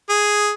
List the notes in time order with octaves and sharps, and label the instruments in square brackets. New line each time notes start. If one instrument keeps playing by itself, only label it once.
[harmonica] G#4